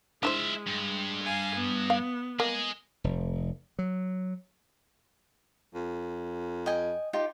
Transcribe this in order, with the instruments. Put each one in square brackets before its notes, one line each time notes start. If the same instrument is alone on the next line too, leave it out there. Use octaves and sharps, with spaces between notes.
[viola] G#3 [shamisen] D4 E4 C5 [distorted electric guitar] F4 E5
[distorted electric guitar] G2
[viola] F5 G#5
B3
[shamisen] F5
[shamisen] A#3 [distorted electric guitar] G#4 D#5
[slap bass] F1
F#3
[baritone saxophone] F2
[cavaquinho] D#5 G5 G#5
D#4 F4 G4